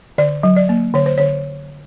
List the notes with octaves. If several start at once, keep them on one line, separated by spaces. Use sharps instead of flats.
D3 D5
F#3
D5
A#3
D3 C#5
C5
D3 C#5